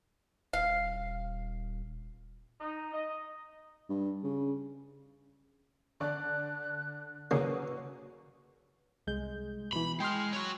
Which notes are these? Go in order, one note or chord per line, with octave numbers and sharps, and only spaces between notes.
D#1 F5
D#4
D#5
G2
C#3
D3 D5 A5 F#6
C#3 F#3 A#3 C#4 F#4 B4
C2 G#3 G6
B2 E3 B5
G#3 G5 C6 F6
F#4 C#5